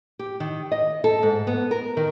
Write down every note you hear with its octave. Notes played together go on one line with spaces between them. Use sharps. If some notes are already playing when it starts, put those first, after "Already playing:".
G4
D#3
D#5
A4
G#2
B3
A#4
D#3